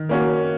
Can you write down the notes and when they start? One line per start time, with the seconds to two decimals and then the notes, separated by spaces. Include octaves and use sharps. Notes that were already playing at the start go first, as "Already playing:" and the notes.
Already playing: D#3
0.09 A#3 C#4 F#4